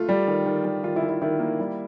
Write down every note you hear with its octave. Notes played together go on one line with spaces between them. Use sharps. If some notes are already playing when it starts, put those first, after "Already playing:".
Already playing: A3 F4
G3
D#3
D#3
G3
D#3 F4
E4
D#3
E4
D#3 E4
A#3
G3